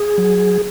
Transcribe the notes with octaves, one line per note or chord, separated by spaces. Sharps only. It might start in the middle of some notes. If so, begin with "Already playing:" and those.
Already playing: G#4
F#3